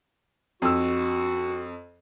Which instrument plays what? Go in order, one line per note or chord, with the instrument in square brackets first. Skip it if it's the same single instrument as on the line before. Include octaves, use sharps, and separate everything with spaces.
[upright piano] F2 E6 [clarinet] F#4